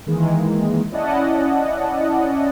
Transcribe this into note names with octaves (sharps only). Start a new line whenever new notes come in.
D#3 E3 G#3 A#3
C#4 E4 D5 D#5 F#5 A5